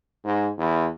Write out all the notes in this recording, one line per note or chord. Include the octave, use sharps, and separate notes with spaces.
G#2
E2